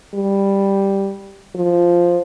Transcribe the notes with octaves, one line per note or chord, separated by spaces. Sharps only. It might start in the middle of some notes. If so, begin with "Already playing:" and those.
G3
F3